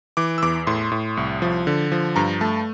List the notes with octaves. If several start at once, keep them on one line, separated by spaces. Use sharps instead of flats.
E3 D6
E6
E2 D6
A2 C6
A2
C2
F3
D3
F3
G2 A#5
A3 A5